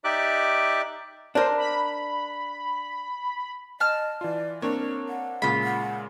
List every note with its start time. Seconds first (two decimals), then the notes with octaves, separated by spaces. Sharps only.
0.04 D#4 G4 D5 E5 D6 F#6
1.35 D4 A#4 C5
1.57 B5
3.80 D#5 A5 F6
4.21 E3 F4 D5
4.62 A#3 C4 D4 A#4 C#5
5.09 F#5
5.42 A#2 C#3 G#3 F4 B5
5.63 F#5